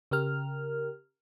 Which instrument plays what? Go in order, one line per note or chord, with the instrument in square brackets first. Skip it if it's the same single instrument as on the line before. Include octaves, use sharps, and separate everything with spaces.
[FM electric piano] C#3 G4 A#4 F6